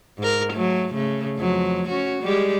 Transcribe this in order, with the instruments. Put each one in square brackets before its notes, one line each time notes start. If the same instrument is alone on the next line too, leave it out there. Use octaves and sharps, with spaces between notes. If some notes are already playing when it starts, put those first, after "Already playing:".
[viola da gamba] G#2 A#4
F#3 A3
C#3 A3
F2 F#3
C#4 F#4
G3 G#3 G4